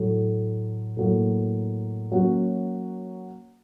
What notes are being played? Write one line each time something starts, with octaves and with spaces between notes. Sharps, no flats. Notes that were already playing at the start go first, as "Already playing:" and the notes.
Already playing: A2 F#3 A3
A2 F#3 A#3
F#3 A#3 C#4 F#4